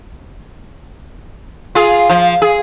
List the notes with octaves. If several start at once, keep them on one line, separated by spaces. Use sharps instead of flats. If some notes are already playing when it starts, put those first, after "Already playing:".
F4 G#4
F3
G#4